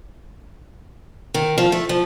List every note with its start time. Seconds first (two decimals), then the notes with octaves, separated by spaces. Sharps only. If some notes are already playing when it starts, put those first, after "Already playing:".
1.34 D#3
1.58 F3
1.72 A3
1.89 F3